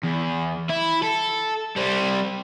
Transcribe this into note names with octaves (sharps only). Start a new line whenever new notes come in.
E2
E4
A4
G3 C4